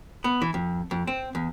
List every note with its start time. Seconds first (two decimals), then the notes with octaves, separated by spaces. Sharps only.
0.24 B3
0.42 E3
0.54 F2
0.91 F2
1.07 C4
1.35 E2